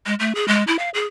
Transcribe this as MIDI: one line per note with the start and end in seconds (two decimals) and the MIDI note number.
0.06 0.15 56
0.20 0.35 57
0.35 0.45 68
0.48 0.64 56
0.67 0.77 64
0.79 0.90 77
0.94 1.06 68